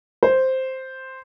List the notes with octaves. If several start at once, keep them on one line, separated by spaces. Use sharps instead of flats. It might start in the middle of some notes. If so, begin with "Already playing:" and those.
C5